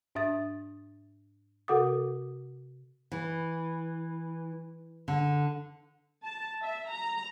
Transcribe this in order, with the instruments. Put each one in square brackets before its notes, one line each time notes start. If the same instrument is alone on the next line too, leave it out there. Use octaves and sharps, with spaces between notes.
[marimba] G#2 D4 E5 D#6 A6
C3 F#4 A4 F#5 D6 D#6
[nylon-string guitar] E3
D3
[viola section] A5
E5
A#5